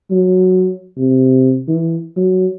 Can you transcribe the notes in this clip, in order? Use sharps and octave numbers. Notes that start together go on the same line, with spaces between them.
F#3
C3
E3
F#3